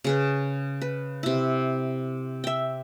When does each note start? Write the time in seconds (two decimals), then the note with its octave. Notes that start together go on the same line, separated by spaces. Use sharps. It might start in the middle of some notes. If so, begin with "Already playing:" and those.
0.04 C#3 G#4 B4
0.81 B4
1.23 C3 E4
2.44 E5 G5